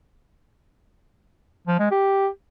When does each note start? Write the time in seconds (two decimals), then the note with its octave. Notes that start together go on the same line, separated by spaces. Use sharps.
1.68 F3
1.79 G#3
1.91 G4